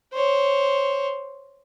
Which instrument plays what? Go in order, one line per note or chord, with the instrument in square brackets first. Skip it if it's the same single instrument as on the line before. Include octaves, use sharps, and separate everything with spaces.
[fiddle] C5 C#5